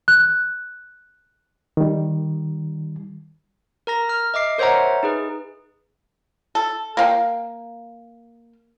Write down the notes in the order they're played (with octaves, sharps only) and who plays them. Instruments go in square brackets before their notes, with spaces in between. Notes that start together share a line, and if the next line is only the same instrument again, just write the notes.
[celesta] F#6
[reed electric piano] D#3 G3
[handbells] A#4 A#5 A#6
F6
D#5 E5 D6 C7
A#4 C5 C#5 E5 F#5 A#5
D#4 G#4 B4
[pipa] A4
A#3 F5 G5